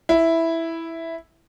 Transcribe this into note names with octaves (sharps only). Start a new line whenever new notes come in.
E4